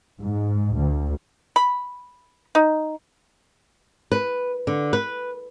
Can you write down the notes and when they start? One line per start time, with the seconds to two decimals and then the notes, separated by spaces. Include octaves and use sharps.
0.20 G#2
0.76 D2
1.56 B5
2.55 D#4
4.12 B4
4.67 D3
4.93 B4